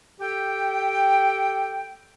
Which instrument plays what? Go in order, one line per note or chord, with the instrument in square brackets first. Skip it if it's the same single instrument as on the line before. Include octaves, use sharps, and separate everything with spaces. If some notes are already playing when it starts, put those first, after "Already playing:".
[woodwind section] G4 A4 G5